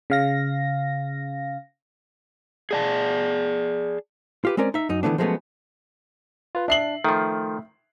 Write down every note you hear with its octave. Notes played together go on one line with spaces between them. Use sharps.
C#3 F5 A#6
G#4 D5 A5
F4 G4 B4
G#3 C4 C#4 A#4 D5
D#4 E5
F#2 D#4
D#3 E3 G#3 A3 B3 D4
F3 F#3 G#3 A3 B3 C#4
F4 B4
D4 E5 C7 F#7
D#3 F3 A3